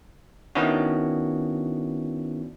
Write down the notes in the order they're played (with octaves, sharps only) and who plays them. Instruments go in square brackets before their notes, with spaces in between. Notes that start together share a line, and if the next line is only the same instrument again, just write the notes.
[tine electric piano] D#3 B3 C#4 D4 E4 F#4